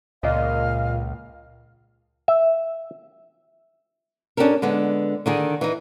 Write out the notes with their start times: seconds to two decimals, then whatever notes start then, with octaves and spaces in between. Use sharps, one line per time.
0.23 C#2 A#2 D#5 F5
2.28 E5
4.37 C#4 D4 F#4 G4 A4 A#4
4.62 D3 G#3 B3
5.26 D3 D#3 G#4
5.61 E3 D#4